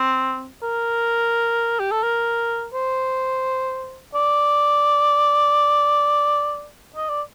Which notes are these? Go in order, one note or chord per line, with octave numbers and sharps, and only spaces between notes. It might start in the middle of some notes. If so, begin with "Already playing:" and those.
Already playing: C4
A#4
G4
A4
A#4
C5
D5
D#5
D5